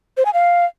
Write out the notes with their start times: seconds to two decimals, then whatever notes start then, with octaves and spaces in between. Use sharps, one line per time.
0.17 C5
0.25 G#5
0.34 F5